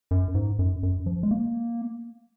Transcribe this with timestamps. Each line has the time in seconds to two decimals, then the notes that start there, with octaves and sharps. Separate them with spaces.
0.11 F#2
0.35 G#2
0.59 F#2
0.83 F#2
1.06 F3
1.23 G#3
1.31 A#3